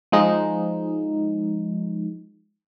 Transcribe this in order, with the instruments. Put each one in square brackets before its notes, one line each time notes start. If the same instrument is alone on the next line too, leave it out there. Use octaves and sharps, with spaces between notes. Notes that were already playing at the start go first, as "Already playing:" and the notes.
[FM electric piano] F3 G#3 D#4